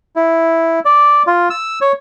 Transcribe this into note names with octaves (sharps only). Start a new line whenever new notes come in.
E4
D5
F4
E6
C#5